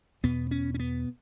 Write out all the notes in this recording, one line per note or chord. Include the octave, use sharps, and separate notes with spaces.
E2 B2 B3
C#4
C#4
B3